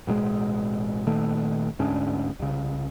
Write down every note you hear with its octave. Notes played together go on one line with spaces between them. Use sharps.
A1 B2 D3 G#3
A#2 D#3 A3
D2 G#2 C#4 D4
C2 C#3